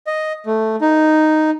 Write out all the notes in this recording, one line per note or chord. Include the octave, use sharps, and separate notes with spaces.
D#5
A3
D#4